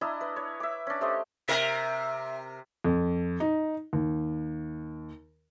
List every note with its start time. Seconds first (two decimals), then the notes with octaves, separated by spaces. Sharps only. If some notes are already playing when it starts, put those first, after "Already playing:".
0.01 D4 E4 D#5 A#5
0.21 B4
0.36 C#5
0.60 E5 D6
0.87 C#4 D4
1.01 A3 G4 C5 D#5
1.49 C3 A#4 E5
2.84 F2
3.40 D#4
3.93 D#2